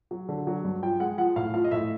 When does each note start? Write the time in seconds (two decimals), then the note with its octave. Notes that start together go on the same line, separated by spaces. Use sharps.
0.11 F#3
0.29 D3
0.47 F#3
0.64 G2
0.83 F3 G5
1.00 G#3 F#5
1.18 F3 F#5
1.36 A2 F5
1.54 F3 F5
1.64 D#5
1.71 A2 E5